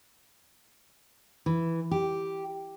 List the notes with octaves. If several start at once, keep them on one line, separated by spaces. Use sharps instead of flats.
E3
G4